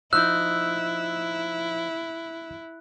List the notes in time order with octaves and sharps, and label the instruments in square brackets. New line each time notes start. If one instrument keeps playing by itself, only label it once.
[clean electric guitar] F3 D#4 [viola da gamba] E4 [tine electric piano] E6 [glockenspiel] F#6